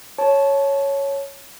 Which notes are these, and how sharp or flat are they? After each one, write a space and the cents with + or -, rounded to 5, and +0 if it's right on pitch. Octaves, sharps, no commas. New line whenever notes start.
C#5 +0 A5 -15